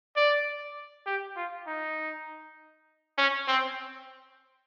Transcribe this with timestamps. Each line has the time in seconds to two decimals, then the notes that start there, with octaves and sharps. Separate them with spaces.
0.16 D5
1.06 G4
1.36 F4
1.67 D#4
3.18 C#4
3.48 C4